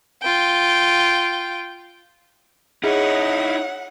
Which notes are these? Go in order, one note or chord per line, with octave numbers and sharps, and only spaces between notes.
F4 G5
D#4 E4 G#4 C#5 D#5 F#5